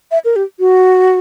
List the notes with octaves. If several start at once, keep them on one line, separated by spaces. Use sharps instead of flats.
E5
A#4
G4
F#4